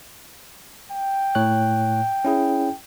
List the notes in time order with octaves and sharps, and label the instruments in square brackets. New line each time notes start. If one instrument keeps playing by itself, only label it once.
[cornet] G5
[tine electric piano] A2 C#5 F#6
C#4 E4 G#4